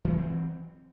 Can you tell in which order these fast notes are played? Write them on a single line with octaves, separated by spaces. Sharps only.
E3 A3 F#3 C4